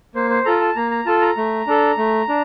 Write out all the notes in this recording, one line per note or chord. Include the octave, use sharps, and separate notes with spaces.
A#3 C5
C5
F4 A4 A#5
A5
A#3 A#5
A#5
F4 A4 A5
A#5
A3
D4 A4
A3
D4